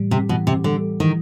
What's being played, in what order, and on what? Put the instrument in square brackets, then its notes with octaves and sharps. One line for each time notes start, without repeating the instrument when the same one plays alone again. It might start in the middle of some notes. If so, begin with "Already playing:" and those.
Already playing: [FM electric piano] A2 E3 G3
[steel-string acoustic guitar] C3
[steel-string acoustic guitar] B2 [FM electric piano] E3
[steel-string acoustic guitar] C3
[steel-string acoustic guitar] D3 [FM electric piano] G3
[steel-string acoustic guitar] D#3 [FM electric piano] E3